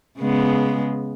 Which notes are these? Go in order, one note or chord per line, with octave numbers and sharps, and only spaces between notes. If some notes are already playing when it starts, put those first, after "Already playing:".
C#3 G#3 B3